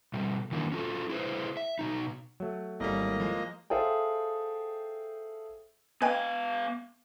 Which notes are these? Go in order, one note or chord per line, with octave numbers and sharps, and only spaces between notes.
B2 G3
D#3 E3 F#3 A#3 D4
C#4 F4 A4
E4 G#4 B4 C5
E5
B2 F3 D#4
F#3 A3
G#1 A2 G3 A#3 D#5
F3 G#3
G#4 A4 C5 E5 F5 G5
B3 B4 D#5 F5 G5 G#5